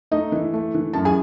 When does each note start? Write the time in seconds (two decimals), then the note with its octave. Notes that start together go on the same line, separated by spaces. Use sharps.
0.11 A3 D#4 D#5
0.32 E3
0.54 A3
0.74 E3
0.93 F#2 A5
1.05 G#4 G#5